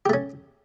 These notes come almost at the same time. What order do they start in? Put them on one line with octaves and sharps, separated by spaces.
G4 A3 C#4